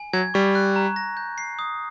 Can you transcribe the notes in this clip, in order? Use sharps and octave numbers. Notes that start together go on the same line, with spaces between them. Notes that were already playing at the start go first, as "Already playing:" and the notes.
Already playing: G#5
F#3 G#6
G3 C#6
F#6
A#5
A#6
G6
C7
D#6